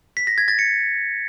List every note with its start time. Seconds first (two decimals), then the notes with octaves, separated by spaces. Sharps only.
0.17 B6
0.27 A#6
0.38 G#6
0.48 A6
0.59 C#7